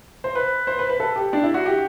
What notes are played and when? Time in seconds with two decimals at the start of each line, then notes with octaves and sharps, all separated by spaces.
0.24 C5
0.35 B4
0.67 C5
0.79 B4
0.90 B4
1.00 A4
1.16 G4
1.33 D4
1.43 E4
1.54 F#4
1.66 G4